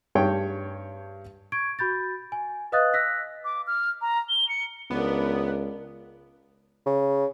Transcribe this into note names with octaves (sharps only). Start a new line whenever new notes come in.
G2 C#5 G5 A5
C#6 G#6 D7
F#4 B5 G6 A6
G#5
B4 D#5 F5 D#6 F#6 A6
E6 F#6 A#6 B6
D6
F6
A#5
G7
C#7
C#2 B3 D4 A#4
C#3